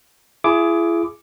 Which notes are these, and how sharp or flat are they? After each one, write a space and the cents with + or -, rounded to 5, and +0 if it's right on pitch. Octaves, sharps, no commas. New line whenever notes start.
E4 +40 G#4 +15 D6 +0